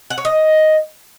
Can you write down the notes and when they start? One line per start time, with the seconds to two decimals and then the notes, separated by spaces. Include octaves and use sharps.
0.10 F#5
0.18 C#5
0.25 D#5